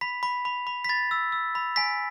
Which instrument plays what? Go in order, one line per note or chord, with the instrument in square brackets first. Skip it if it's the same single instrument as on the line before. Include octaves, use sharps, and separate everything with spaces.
[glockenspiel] B5 B6
B5
B5
B5
B6
B5 A6
E6
E6
B5
G#5 B6